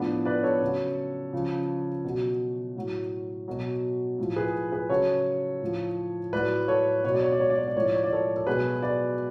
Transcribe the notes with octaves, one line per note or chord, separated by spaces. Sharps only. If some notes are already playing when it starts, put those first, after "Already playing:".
Already playing: A2 F3 B3 D4
B4 D5
A4 C#5
C#3 F#3
C#3 F3
B2 F#3
A2 F#3
B2 F#3
A2 F3
G#4 B4
G#4 B4
C#3 F#3 A4 C#5
A2 F3
A2 F#3 B4 D5
A4 C#5
B2 F#3 C#5
D5
C#5
D5
C#5
D5
C#5
D5
A2 F3 C#5
D5
C#5
D5
A4 C#5
A4
B2 F#3 G#4 B4
B4 D5